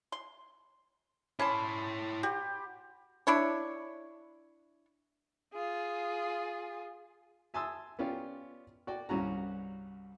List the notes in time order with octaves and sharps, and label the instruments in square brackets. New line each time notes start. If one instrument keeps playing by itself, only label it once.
[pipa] C6
[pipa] C#4 A5 [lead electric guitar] E4 C#5 [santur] D5 B5 C6
[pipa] F#4 [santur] G4
[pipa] D4 E4 C#5
[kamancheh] F4 G#4
[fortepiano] E5 G#5 A5 C6 D#6 E6
B3 C#4 F4 G4 D5
F#4 D5 G5
C2 G2 C#4 F#4 A#5